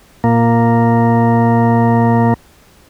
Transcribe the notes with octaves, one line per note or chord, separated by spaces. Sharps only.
A#2 A#3